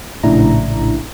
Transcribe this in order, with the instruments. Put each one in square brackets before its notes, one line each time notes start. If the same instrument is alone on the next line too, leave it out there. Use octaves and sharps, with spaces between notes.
[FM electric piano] A#1 A2 C#3 D4 E4 A#5